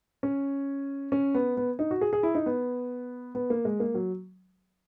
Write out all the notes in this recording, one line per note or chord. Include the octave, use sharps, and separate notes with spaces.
C#4
C#4
B3
B3
D#4
F#4
G#4
G#4
E4
D#4
B3
B3
A#3
G#3
A#3
F#3